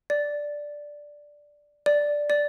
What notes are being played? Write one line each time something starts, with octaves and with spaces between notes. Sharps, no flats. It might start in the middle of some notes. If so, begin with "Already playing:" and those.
D5
D5
D5